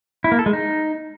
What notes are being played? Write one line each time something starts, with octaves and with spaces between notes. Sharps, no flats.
E4
A#3
A4
G#3
D#4